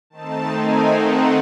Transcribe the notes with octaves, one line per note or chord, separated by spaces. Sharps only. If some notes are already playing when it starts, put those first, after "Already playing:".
D#3 A3 C4 D#4 A5
G#5
F#5